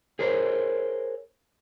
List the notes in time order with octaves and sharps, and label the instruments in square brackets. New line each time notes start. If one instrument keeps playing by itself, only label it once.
[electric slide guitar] G#4 A#4 C5 C#5